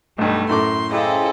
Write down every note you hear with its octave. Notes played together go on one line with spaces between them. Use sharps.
B1 G2 A3 D#4
F#2 A2 C6 D6
C#3 E4 G4 A4 C5 D#5